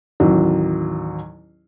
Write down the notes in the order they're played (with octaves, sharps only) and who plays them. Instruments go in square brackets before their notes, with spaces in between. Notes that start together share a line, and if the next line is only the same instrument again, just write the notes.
[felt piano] A1 D#2 F#3